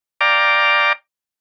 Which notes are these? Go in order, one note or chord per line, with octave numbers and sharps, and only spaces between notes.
D5 F5 G5 A#5 D6